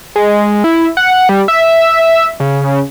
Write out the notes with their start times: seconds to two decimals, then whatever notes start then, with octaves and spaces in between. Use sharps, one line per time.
0.16 G#3
0.64 E4
0.97 F#5
1.29 G3
1.48 E5
2.40 C#3